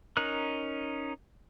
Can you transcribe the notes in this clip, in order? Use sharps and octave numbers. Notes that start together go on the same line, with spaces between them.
C#4 D#4 A#4 F#6